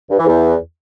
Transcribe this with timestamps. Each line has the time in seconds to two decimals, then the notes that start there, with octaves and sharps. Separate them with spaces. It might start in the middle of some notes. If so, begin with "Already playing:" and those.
0.10 G2
0.18 E3
0.26 E2